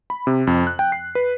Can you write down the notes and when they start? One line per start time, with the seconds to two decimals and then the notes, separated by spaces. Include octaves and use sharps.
0.10 B5
0.27 C3
0.47 F2
0.67 F#6
0.79 G5
0.92 C7
1.15 B4